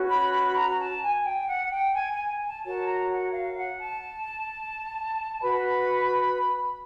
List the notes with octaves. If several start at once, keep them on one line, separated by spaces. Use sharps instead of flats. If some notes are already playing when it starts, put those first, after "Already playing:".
Already playing: C#4 F#4 B4
B5
B5
A#5
A#5
A5
G#5
G5
F#5
F#5
G5
G#5
G#5
G#5
A5
F#4 A#4 C#5 A5
A#5
F#5
F5
F#5
A5
F#4 B4 B5